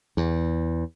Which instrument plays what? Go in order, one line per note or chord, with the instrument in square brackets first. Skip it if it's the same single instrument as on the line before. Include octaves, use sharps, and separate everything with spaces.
[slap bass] E2